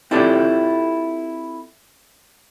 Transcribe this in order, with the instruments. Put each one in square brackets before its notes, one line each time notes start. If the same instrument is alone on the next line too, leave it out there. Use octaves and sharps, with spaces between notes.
[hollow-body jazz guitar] C4 E4 F4 G4 A4 D5